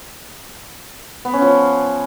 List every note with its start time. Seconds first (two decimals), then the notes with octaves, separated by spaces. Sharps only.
1.25 B3
1.33 C#4
1.42 F3